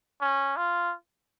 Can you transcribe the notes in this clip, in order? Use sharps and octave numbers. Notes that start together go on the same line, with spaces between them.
C#4
F4